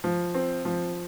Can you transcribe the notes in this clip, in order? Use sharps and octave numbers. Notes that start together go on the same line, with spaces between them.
F3
C4
F3